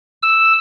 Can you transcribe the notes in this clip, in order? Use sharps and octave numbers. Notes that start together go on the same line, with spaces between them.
E6